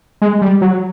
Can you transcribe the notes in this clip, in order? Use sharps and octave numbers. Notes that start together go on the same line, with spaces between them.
G#3
G3
F#3